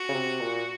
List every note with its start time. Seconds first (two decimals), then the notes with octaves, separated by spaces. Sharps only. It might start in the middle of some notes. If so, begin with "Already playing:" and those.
Already playing: F#4
0.09 C#3
0.14 C3
0.40 A#2